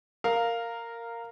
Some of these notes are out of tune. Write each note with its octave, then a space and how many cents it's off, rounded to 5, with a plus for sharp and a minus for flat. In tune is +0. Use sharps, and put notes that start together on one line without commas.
A#4 -10 F5 +0